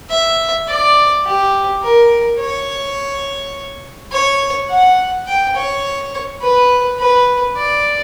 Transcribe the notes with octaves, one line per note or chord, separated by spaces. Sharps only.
E5
D5
G4
A#4
C#5
C#5
F#5
G5
C#5
B4
B4
D5